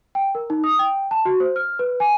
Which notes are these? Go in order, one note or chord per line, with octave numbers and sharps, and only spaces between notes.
G5
A#4
D#4
D#6
G5
A5
F#4
C5
F6
B4
G#5